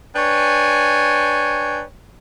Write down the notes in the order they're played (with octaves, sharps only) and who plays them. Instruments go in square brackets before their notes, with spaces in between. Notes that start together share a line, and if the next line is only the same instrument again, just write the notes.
[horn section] D4 B4 C#5 G5 G#5